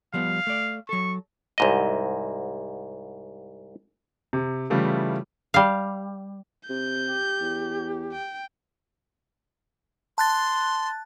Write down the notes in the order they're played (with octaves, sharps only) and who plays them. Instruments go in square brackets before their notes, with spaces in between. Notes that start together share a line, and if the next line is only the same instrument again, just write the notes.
[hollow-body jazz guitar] F3 G3 B3 [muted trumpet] F5
[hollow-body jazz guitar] A3 D5
[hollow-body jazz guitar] F#3 A4 [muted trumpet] C#6
[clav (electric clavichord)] C2 G#2 D#5
[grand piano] C3
C#3 E3 G3 A3 E4 F4
[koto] G3 F5
[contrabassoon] C3 [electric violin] G6
[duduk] G4
[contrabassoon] E2
[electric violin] G5
[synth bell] A5 F#6 A6 [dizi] C6